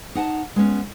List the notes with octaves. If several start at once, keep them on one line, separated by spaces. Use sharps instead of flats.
D#4 F#5 G#5 A5
G#3 B3 C#4